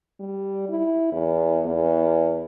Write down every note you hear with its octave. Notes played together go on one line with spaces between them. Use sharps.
G3
E4
E2
E2